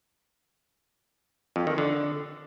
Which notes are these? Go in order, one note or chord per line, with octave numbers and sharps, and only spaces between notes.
F2
D#3
D3